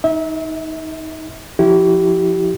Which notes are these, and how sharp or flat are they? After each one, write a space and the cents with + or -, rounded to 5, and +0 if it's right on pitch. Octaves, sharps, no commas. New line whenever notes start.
D#4 +15 E5 -30
F3 -5 E4 +0 G4 -30